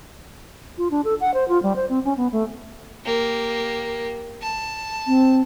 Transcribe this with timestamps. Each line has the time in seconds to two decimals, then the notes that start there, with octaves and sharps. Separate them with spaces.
0.78 F4
0.91 D4
1.05 A4
1.21 F#5
1.34 C5
1.49 F4
1.63 G3
1.76 C5
1.89 C4
2.05 C#4
2.17 B3
2.32 A3
3.05 A#3 G4
4.42 A5
5.07 C4